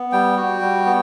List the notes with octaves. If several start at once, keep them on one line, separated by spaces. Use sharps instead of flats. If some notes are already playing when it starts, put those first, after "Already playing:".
Already playing: B3
G3 G5
F#4
G3
B3